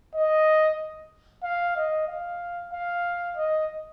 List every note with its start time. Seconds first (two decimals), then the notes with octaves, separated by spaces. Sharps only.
0.15 D#5
1.43 F5
1.76 D#5
2.08 F5
2.73 F5
3.37 D#5